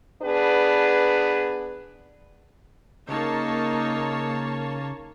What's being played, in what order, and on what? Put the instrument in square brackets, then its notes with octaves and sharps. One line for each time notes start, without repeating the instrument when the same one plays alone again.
[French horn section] B3 D4 G#4 B4
[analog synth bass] C#3 [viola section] A#3 C#5 A5 [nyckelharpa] D#4